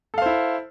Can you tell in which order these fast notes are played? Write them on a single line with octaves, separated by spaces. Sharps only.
A4 F5 C5 E4